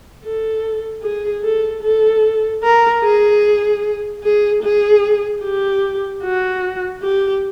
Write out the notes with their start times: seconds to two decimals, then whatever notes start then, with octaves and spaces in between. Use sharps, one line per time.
0.24 A4
1.03 G#4
1.43 A4
1.83 A4
2.63 A#4
3.03 G#4
4.24 G#4
4.63 G#4
5.43 G4
6.23 F#4
7.02 G4